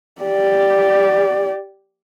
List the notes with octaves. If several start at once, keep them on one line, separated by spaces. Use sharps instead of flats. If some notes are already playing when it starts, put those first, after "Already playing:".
G4 D5